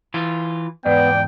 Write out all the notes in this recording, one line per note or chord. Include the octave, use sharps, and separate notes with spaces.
E3 F4
E2 G#2 B3 D5 G5